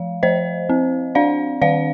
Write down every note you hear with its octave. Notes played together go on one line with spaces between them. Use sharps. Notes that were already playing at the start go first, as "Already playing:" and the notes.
Already playing: F3 F5
F3 C5 D#5
C4
D4 D5 F5
D#3 D5 F5